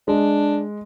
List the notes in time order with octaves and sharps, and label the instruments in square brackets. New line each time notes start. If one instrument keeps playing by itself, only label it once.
[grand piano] G#3 [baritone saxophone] D4